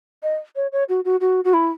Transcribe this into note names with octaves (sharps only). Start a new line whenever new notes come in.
D#5
C#5
C#5
F#4
F#4
F#4
F#4
E4